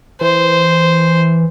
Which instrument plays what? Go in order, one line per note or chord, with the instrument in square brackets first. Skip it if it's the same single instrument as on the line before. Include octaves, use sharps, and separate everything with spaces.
[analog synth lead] E3 [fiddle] C5